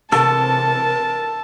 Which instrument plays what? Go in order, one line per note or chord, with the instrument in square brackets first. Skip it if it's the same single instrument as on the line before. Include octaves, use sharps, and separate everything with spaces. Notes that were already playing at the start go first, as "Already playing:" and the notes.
[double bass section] C3 E3 C4 [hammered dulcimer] A4 [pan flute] A#4 [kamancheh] A5